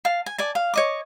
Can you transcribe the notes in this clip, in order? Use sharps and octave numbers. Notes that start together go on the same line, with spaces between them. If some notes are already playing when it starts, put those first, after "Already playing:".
F5 A5
G#5
D5 G#5 A5
F5
C#5 D#5 D6